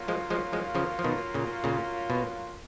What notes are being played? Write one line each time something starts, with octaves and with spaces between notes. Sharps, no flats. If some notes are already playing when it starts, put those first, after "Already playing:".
Already playing: F#3 A#3 C#4 F4
F3 G#3
F3 G#3
F3 G#3
C#3 F3
F3
B2 D#3
A#2 C#3
A#2 C#3
B2